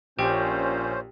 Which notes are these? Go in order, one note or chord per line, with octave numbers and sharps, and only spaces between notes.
A#1 A#2 C#4 G4 C5 G5 C#6